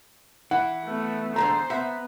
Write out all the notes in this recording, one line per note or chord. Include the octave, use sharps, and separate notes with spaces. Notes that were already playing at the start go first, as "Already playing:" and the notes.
E3 E4 F#5
A3 B3
E2 D3 A3 C5 A#5
B3 E5 F#5